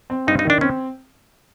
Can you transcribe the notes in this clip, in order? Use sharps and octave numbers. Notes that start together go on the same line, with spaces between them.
C4
G2 D#4
D#4
D#3 D4
C4 C#4